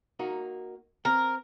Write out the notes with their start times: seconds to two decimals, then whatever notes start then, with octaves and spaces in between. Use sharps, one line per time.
0.19 A#3 D#4 F#4
1.05 C4 A#4